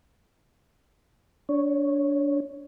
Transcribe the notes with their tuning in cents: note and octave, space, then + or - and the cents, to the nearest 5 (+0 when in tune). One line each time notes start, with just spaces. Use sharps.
D4 -25 C#5 +0